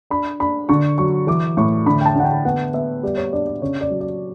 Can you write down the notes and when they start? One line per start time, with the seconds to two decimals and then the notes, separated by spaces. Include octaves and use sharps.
0.10 D4 B5
0.40 D4 B5
0.69 D3 C#6
0.98 F#3 C#6
1.27 E3 D6
1.57 A2 C#6
1.86 D3 B5
2.01 G5
2.05 A5
2.15 D3 F#5
2.25 G5
2.45 B3 F#5
2.74 B3 E5
3.03 G3 D5
3.17 C#5
3.33 D4 D5
3.47 D5
3.61 C#3 C#5
3.81 D5
3.90 F#3
4.01 D5